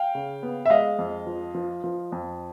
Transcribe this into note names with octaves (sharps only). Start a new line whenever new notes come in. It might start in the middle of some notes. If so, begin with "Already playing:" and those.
Already playing: F5 G5
C#3
B3
E5
G#3 D#5 F5
F2
F3
F3
F3
F2